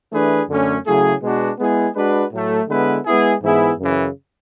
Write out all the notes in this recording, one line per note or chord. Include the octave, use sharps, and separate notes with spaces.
E3 A3 D4 G#4 B4
F#2 D3 A3 C#4
C#3 F#3 A3 E4 G#4
B2 G#3 B3 D4 F#4
G#3 B3 E4 G#4
G#3 D4 F#4 B4
A2 F#3 A3
D3 G#3 B3 E4 B4
G#3 B3 E4 G#4
G#2 E3 B3 E4 G#4
F#2 C#3 E3